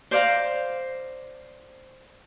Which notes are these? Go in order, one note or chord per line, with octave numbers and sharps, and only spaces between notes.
C5 D5 F5 A#5